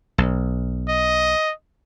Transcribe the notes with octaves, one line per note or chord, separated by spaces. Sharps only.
B1
D#5